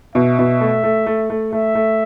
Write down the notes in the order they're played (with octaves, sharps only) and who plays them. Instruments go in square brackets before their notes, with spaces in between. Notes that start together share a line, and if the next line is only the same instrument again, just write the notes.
[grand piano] B2 [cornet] E5
[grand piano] B2
A3
A3
A3
A3
[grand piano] A3 [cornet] E5
[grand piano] A3